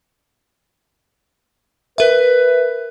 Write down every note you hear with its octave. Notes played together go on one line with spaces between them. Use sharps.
A#4 B4 E5